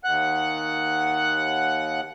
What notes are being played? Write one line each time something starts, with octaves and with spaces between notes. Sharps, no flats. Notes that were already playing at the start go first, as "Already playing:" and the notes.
D#2 F#5 F#6